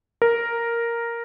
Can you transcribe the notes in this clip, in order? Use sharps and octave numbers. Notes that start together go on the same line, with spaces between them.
A#4